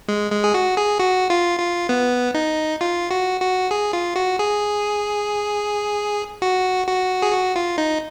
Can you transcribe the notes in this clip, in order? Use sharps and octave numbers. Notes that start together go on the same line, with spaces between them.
G#3
G#3
G#4
F#4
G#4
F#4
F4
F4
B3
D#4
F4
F#4
F#4
G#4
F4
F#4
G#4
F#4
F#4
G#4
F#4
F4
D#4